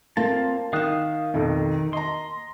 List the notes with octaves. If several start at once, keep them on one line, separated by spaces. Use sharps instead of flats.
A#3 C4 F4 A5
D#3 F5 D#6 F#6 E7
B1 F2 D#3
D#5 A#5 C6